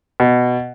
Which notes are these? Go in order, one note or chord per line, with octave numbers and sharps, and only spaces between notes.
B2